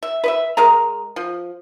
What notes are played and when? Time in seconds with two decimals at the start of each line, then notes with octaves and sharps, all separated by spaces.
0.03 E5
0.24 B4 D#5 E5
0.57 G#3 A#4 D#5 A#5
1.16 F3